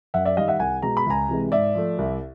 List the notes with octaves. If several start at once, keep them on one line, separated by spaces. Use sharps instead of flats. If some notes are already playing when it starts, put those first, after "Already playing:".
F#2 E5 F#5
D5 E5
D#3 G3 D#5 F5
E5 F#5
C2 F#5 G#5
B2 G#3 A#5
B5
C#2 G#5 A#5
C3 E3 G#3
G#2 D5 E5
F3 A3
C2